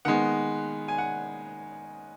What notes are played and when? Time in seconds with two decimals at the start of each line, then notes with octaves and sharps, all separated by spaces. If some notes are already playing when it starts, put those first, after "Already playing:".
0.05 D#3 G#3 B3 F#5
0.88 G#5
0.98 F#5